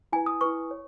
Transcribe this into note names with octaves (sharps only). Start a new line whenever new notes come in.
E4 B4 G#5
D#6
E4 B4 C#6
C#5